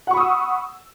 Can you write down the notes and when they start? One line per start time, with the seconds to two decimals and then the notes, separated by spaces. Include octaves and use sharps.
0.07 F#5
0.11 C#6
0.14 B5
0.17 D#6
0.20 E6